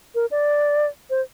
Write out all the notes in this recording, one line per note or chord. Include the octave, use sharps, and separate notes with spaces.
A#4
D5
C5